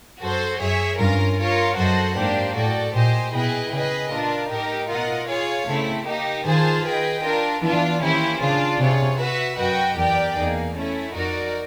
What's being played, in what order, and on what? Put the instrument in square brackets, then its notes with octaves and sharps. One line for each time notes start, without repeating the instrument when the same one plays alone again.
[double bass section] F#2 [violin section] F#4 A4 C5
[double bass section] F#2 [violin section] G#4 C#5 E5
[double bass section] G2 [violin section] C#4 F4 A#4
[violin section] F4 A#4 C#5
[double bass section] F#2 [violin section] F#4 A4 C5 D#5 F#5
[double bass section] G#2 [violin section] A#3 D4 G4 C5
[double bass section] A2 [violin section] F#4 A4 D5 G5
[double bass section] A#2 [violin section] G4 C5 D#5 G#5
[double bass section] B2 [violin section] E4 G#4 B4 D#5 G5
[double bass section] C#3 [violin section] G#4 B4 D#5
[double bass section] A#2 [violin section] D4 F4 A#4
[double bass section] A2 [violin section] D#4 G4 A#4
[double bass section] B2 [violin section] F4 A#4 D#5 F#5
[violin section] F4 G#4 C#5 F5
[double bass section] C#3 [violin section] A3 C4 E4
[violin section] A#3 D#4 G4
[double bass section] D#3 [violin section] F4 G#4 C5 F5 A5
[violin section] G#4 B4 D#5 G5
D4 F4 A#4
[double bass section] E3 [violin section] B3 D4 F4
[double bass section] D#3 [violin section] A#3 C#4 E4 G4 C5
[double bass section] C#3 [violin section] D4 F4 G#4
[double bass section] C3 [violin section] F4 G#4 C#5
[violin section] F#4 B4 E5
[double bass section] F#2 [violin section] F#4 B4 D#5 G5
[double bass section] E2 [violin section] G4 A#4 D5 G5
[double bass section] E2 [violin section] A#3 D#4 G#4
[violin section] A3 C#4 E4
[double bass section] F2 [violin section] D#4 F#4 A#4 D5